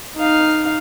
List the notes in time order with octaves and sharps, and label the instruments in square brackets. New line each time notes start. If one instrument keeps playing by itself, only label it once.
[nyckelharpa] D#4 F5